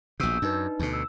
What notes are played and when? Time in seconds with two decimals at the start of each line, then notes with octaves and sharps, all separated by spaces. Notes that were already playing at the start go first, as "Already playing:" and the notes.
0.20 A#1 B2 E6 G6
0.42 F#2 D4 D#4 B4
0.79 D2 B2
0.93 E6